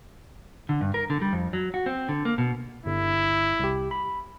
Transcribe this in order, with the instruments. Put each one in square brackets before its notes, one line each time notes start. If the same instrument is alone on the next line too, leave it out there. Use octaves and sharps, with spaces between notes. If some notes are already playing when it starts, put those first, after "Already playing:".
[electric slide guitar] D3
G2
A#4
D3
G3
F2
F#3
F#4
C4
D3
A#3
B2
[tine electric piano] G1 [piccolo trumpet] E4
[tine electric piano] C2 G4
B5